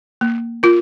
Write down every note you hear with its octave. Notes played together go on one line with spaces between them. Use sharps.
A#3
F4 A#4